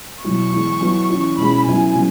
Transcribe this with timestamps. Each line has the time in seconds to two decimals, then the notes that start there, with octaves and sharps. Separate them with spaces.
0.24 B2 F#3 E4 C#6
0.52 E3 G#3 B3
0.81 F#3 B3 E4
1.10 E3 C#4 E4
1.37 B2 G#3 C#4 E4 B5
1.66 C#3 F#3 B3 E4 G#5
1.95 C#3 F#3 B3